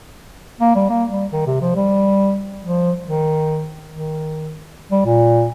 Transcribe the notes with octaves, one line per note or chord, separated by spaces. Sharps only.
A#3
G3
A#3
G3
D#3
C3
F3
G3
F3
D#3
D#3
G3
A#2